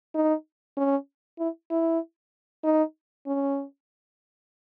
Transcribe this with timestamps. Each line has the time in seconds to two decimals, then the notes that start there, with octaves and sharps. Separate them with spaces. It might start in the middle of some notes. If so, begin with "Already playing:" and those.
0.15 D#4
0.77 C#4
1.39 E4
1.71 E4
2.64 D#4
3.27 C#4